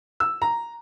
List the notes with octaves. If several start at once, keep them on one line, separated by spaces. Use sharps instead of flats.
E6
A#5